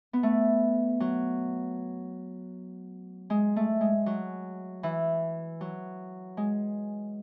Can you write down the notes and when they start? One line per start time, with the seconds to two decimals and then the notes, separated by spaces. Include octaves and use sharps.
0.13 B3
0.23 A3
1.00 F#3
3.30 G#3
3.56 A3
3.81 G#3
4.06 F#3
4.83 E3
5.61 F#3
6.37 G#3